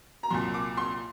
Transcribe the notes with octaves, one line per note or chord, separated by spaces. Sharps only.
A#5
C2 A#2 F#3 C6
D6
C6